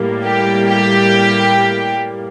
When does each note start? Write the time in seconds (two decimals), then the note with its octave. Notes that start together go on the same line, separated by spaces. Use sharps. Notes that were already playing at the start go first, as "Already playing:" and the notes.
Already playing: A2 G3 A#3
0.24 G4
0.70 G4